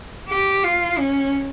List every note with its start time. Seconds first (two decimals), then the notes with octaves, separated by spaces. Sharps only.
0.29 G4
0.64 F4
0.99 C#4